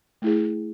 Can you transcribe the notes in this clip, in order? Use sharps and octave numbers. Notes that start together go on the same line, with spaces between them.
A3 E4 G#4